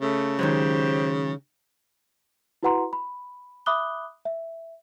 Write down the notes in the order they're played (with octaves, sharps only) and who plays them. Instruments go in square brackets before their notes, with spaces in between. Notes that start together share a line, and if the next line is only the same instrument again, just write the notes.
[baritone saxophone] C#3 [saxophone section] A3
[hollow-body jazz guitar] D#3 F#3 G#3 [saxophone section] G4 C5
[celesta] E4 F#4 B4 F#5 A#5 C6
B5
E5 B5 D6 D#6 F#6 G7
E5